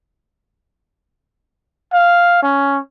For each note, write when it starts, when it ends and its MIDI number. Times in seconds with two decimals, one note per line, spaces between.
1.92 2.40 77
2.42 2.79 61